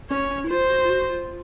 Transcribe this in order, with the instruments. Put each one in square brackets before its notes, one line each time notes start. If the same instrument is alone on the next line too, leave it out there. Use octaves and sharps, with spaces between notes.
[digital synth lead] C#4 [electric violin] C#5
[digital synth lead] C#4
E4
[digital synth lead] F4 [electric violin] C5
[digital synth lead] F#4
F4
F#4
F4